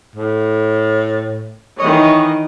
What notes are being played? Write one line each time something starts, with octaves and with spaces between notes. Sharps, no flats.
A2
D#3 E3 C#5 D#5